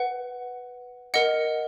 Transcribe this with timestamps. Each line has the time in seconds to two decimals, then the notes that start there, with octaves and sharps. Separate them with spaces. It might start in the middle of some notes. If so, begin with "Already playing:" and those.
Already playing: B4 F#5
1.14 A#4 D#5 F#5 C#7